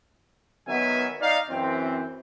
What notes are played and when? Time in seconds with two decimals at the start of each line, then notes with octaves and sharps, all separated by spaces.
0.67 D#3 F#3 B3 E5 G#5
1.20 D#4 D5 F5
1.49 F#2 E3 C4